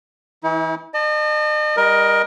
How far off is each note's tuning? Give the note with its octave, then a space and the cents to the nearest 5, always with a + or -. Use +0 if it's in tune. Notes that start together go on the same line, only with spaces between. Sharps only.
E3 -15 E4 -45
D#5 -40 A5 +0
G3 +25 A#4 +20 D#5 +0